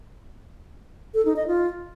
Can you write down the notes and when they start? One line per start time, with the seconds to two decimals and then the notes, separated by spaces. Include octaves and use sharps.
1.14 A4
1.25 D#4
1.36 D#5
1.47 F4